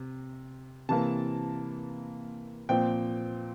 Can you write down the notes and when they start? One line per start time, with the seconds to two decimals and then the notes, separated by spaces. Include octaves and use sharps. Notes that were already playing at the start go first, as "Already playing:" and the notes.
Already playing: C3
0.89 C3 E3 A#3 A5
2.69 A#2 F3 C4 G5